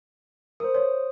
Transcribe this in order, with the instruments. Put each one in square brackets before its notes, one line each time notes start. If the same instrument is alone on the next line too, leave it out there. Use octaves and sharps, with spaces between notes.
[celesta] A#4 [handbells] C5 D#6
[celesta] C#5